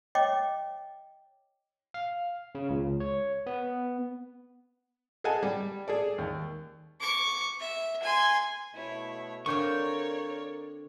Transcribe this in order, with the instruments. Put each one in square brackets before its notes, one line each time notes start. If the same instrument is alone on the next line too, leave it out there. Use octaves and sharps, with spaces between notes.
[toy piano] C#5 D#5 G5 D6
[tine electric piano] F5
C#3
C#2
C#5
B3
[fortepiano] G#4 A4 D#5 F#5 G#5 A5
G3
G#4 A4 D5
D#2
[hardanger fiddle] C#6 D6
E5
G#5 C6
[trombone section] B2 A3 [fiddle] E4 C#5
[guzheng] D3 C4 F5 [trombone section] A#4 [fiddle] C#5 D5 [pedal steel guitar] C#6 G6